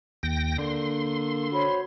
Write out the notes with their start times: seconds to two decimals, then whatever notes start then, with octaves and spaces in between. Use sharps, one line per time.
0.23 D#2 G5 A#6
0.58 D3 A#3 C6
1.52 F#4 C5 C#5 B5